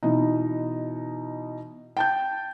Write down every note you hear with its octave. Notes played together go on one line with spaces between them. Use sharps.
B2 E3 D#4
G5 A5 G6